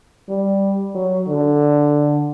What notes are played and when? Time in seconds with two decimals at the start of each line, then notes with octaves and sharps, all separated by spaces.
0.29 G3
0.95 F#3
1.28 D3